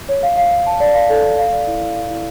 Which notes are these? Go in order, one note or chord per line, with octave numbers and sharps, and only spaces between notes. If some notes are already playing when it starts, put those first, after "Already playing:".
C#5
F5
F5
F5
A5
D5
F5
A4
A4
F5
D5
E4
E4
F5
E4